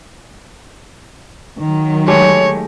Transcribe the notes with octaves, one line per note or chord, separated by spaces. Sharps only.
D#3 F#3
G#3 A3 G4 C#5